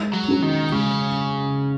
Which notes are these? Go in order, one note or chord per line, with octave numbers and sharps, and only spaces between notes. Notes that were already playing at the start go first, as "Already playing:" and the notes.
Already playing: G#3
F#3
C#4 F#4
D#3
C#3 G#3